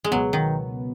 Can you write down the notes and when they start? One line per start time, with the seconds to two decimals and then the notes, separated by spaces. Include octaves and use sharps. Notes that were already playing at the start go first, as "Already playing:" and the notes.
0.04 G#3
0.11 C#2 B2 F#3 B3
0.33 D#3